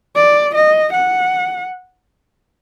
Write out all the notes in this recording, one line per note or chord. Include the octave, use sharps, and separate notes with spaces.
D5
D#5
F#5